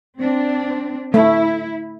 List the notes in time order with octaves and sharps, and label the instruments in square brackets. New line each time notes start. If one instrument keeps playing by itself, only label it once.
[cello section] C4 D4
[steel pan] A3 [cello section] E4